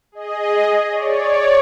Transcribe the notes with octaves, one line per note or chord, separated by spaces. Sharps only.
G#4 D#5
C#5 D5